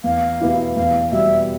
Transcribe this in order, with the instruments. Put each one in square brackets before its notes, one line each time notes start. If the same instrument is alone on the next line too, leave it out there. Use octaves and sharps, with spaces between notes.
[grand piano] E2 [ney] F5
[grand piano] B2 B3 E4 G4
[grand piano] E2 [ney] F5
[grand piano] B2 G3 [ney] E5